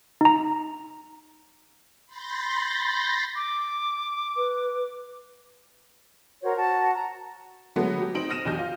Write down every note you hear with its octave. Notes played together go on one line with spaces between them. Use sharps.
D#4 A#5
B5 C6 G6 A6 A#6
D6
B4
F#4 A#4 C5 C#5
F#4 A5
A5 A#5
D3 F#3 G#3 A3 B3
F#3 G4
C4 D#4 D7 F#7
D#6 F6 A#6 D#7 E7
B1 E2 D4 G4 F6 G6
F4